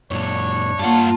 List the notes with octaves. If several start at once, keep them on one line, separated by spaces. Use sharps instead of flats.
F#2 A#2 D4 C#5
G2 A#3 F4 F#5 A5